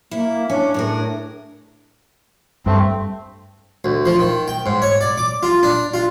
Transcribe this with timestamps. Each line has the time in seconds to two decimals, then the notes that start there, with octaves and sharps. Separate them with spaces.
0.11 A#3 E4
0.50 C#4 D4
0.74 A2 G#4 A#4
2.66 G2 A3 C4
3.85 D2
4.06 F3
4.19 D#3
4.48 G5
4.66 G#2
4.82 C#5
5.01 D5
5.18 D6
5.43 F4
5.63 D4
5.94 F4